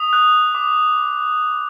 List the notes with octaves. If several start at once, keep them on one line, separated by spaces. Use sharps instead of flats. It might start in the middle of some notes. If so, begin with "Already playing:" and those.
Already playing: D#6
F#6
D6